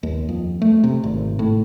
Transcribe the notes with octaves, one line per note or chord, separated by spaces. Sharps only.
D#2
F2
A3
C3
G#1
A2